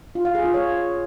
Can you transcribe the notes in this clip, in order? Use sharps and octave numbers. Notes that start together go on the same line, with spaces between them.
F4
F5
G#4
F4
C#5